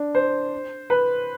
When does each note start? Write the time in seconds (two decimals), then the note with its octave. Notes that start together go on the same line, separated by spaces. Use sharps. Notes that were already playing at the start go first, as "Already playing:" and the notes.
Already playing: D4
0.15 C5
0.90 B4